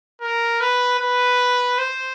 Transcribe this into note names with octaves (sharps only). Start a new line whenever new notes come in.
A#4
B4
B4
C5